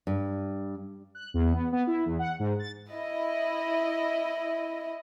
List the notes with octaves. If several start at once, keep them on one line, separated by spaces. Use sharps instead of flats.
G2
F#6
E2
B3
B3
E4
E2
F#5
G#2
A6
E4 D#5